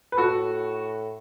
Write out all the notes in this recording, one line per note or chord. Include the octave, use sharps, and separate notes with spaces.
B4
A2 F#4 A4